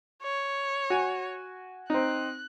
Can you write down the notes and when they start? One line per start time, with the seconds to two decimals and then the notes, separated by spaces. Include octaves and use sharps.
0.22 C#5
0.90 F#4 G#5
1.90 C4 D#4 F#6